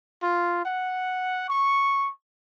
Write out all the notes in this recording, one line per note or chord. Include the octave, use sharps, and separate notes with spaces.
F4
F#5
C#6